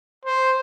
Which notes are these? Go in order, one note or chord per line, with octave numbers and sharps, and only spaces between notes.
C5